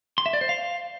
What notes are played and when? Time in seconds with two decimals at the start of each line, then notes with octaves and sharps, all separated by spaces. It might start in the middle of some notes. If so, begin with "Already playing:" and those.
0.18 C6
0.26 E5
0.33 D5
0.41 C5
0.49 F5